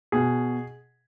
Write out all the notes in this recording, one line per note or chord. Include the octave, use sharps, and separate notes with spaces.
B2 G#4